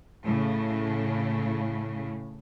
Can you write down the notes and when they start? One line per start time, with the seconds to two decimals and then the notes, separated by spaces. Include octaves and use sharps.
0.25 A2 C#3